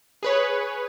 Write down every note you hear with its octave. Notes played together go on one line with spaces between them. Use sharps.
G#4 B4 C#5